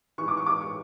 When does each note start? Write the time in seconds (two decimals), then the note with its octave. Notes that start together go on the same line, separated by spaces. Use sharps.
0.18 E3 C#6
0.22 G#2
0.28 D6
0.37 C#6
0.46 G#2 E3 D6
0.61 C#6